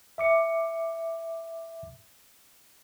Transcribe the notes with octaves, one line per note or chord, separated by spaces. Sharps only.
E5 D6 C#7